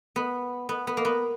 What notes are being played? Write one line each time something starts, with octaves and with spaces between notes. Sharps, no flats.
B3
B3
B3
A#3
B3